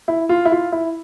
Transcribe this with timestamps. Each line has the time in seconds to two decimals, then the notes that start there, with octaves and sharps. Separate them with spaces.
0.08 E4
0.29 F4
0.45 E4
0.52 F4
0.72 E4